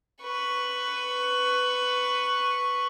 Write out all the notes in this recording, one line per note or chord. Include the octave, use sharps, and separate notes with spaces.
B4 C#6